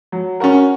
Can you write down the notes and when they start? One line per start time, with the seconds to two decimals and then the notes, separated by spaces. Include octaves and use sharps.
0.12 F#3
0.40 C#4 F#4 A#4